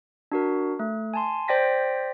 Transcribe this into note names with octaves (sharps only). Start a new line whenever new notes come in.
D4 F#4 A#4
A3
G#5 A5 C6
C5 D5 G5 A#6 B6